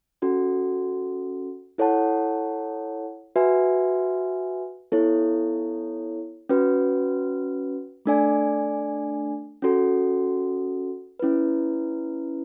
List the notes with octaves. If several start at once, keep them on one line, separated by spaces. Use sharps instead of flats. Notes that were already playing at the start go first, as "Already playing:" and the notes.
C#4 F#4 A4
E4 A4 C#5 F#5 A5
F#4 B4 E5 G#5
B3 E4 A4 C#5
C#4 F#4 B4
A3 D4 A4 D5 G#5
C#4 F#4 A4
C#4 E4 B4